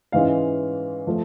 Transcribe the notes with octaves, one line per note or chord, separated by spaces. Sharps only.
G#2 E3 G#3 C#4 F5
F3 A3